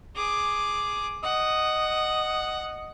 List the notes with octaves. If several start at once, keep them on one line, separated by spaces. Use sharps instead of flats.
G#4 D6
D#5 F#5